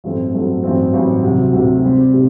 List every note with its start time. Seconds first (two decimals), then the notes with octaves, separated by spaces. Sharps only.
0.04 A1 G2 F#3 A3 C4
0.33 A1 G2 F#3 A3 C4
0.63 A1 G2 F#3 C4
0.93 A1 G2 F#3 C4
1.23 D2 C3 F#3
1.53 D2 C3 F#3
1.83 C3 G3 C4 G4
2.13 C3 G3